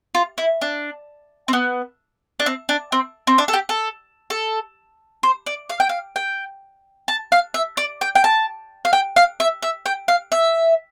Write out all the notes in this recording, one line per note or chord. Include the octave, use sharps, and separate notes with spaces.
F4
E4
D4
C4
B3
D4
C4
D4
C4
C4
D4
A4
G4
A4
A4
C5
D5
F5
G5
F5
G5
A5
F5
E5
D5
G5
G5
A5
F5
G5
F5
E5
E5
G5
F5
E5